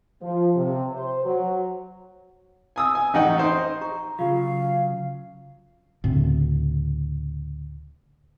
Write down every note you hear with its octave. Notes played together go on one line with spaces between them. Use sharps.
F3
C3
C5
F#3
G#5 D#6 E6
G#5
A1 D#4 D#5 F#5 G5
D#4 C5
G4 A#5 C#6
C#3 F#3 F4 G4 F5
D2 A2 C#3 C4